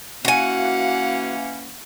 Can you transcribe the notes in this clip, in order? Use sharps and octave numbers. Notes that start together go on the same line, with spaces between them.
E3 A#3 C#4 F#4 F5 F#5 G#5